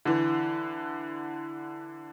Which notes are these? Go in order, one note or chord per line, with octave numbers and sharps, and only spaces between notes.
D3 E3